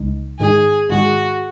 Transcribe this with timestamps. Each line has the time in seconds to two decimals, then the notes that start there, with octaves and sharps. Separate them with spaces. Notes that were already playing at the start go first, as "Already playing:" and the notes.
Already playing: C#2 C#3 G#3 D#4
0.39 G#2 D#3 G#3 D#4 G#4
0.89 G#2 D#3 G#3 D#4 F#4